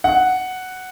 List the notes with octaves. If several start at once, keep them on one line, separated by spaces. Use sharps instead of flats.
F#5